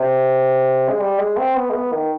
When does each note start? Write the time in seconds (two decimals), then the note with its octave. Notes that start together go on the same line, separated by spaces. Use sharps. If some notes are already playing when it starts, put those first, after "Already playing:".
Already playing: C3
0.89 G#3
1.00 G3
1.18 G#3
1.37 C4
1.55 B3
1.70 G#3
1.74 B3
1.92 D#3